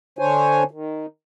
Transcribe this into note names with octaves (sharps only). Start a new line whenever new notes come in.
D3 D4 C5 C#5 G#5
D#3